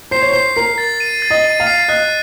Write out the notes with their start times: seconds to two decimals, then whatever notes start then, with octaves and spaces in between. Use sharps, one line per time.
0.11 C5 C7
0.22 C#5
0.32 C5 C7
0.56 A#4 C7
0.78 A6
1.00 D#7
1.22 A6
1.30 D#5
1.44 D#7
1.60 F5
1.67 C7
1.88 D#5 F#6